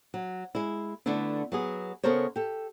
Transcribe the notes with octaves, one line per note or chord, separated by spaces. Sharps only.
F#3
G#3 E4
D3 A3 B3 D4 E4
F#3 B3 G#4
C#3 B3 A4 A#4 C5 C#5
G4 A4